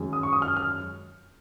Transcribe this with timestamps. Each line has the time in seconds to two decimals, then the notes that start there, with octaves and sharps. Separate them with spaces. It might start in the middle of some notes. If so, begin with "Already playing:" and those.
Already playing: F#2 D#3 G#3
0.13 D#6
0.23 C#6
0.33 D#6
0.42 F6
0.57 F6